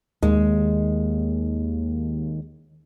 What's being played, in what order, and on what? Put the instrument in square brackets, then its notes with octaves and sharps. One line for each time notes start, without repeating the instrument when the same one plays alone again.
[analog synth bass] D#2 [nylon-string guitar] G#3